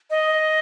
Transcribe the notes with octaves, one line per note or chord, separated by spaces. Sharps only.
D#5